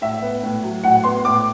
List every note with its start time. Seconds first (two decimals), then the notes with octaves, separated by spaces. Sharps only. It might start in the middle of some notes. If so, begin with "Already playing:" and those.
0.02 A2 E5
0.22 B3
0.43 A2
0.63 F#3
0.84 A2 F#5
1.04 B3 C6
1.25 A2 D6